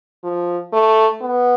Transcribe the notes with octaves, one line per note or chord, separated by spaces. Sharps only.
F3
A3
B3